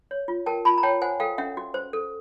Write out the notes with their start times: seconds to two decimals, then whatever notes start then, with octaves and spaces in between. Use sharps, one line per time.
0.11 C#5
0.28 F4
0.46 A#4 G5 A5
0.65 F4 A5 B5
0.78 A#5
0.83 C#5 G5 A5
1.02 C5 F#5 G#5
1.20 A4 F5 G5
1.38 C#4 E5 F#5
1.57 F#4
1.74 C5
1.93 A4